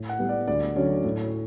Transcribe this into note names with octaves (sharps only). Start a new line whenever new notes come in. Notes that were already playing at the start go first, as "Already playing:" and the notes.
Already playing: A2
F#5
G3 B3
D5
D2 D5
D3 F#3 C#4 C#5
A2